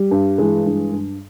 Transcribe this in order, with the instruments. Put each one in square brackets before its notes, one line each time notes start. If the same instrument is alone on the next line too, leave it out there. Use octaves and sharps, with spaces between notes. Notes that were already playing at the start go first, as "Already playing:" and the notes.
Already playing: [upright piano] G3
G2
E3 G#3 G#4
G2
G2